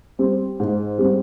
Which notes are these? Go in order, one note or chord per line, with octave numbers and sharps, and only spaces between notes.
G3 C4
G#2
G3 C4